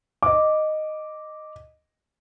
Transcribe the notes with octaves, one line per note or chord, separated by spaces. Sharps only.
D#5 D6